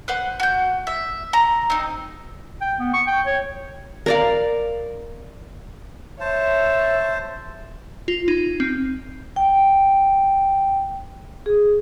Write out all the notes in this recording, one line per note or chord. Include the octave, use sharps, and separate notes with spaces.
B4 C5 F#5
F#4 G6
E5
A#5
C4 D#4
G5
B3
C#6
G5
C#5
A#4 D5 F5
C5 C#5 E5 A5
F4
D#4
C4
G5
G#4